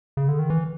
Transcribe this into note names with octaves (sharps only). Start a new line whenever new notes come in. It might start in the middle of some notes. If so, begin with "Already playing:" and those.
C#3
D3
D#3
E3